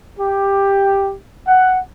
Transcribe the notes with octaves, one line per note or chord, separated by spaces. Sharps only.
G4
F#5